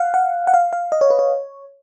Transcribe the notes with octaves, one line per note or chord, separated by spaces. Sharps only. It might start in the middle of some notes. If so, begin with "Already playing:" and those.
Already playing: F5 F#5
F#5
F#5
F5
F5
D#5
C#5
B4
C#5